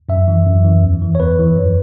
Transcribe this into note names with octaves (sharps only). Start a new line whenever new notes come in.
F#2 E5
E3
F#2
E3
E2
E3
C#5
E2 B4
E3
F#2